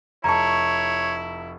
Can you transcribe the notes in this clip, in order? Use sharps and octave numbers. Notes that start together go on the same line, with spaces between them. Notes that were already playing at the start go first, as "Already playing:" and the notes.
F1 E4 C#5 A5 A#5 C#6